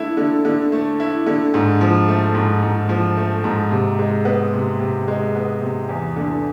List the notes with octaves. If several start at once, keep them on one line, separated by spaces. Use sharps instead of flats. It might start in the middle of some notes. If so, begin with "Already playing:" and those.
Already playing: D3 A3 E4
D3
D3
A3
E4
D3
G#2
F3
A3
G#2
G#2
F3
A3
G#2
C3
G#3
B3
C3
C3
G#3
B3
C3
E2
D3